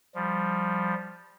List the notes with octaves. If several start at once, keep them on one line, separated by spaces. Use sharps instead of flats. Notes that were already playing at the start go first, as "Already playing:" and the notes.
F3 G3